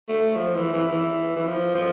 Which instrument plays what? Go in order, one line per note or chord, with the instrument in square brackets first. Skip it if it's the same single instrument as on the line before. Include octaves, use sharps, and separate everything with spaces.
[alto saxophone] A3
F3
E3
E3
E3
E3
F3
F3